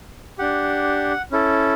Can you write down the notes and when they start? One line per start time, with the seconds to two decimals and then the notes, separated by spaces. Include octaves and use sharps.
0.38 D4 G4 F#5
1.31 C#4 E4 A4